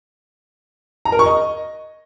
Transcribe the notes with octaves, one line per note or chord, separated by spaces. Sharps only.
A#5
A#4
C#6
D#5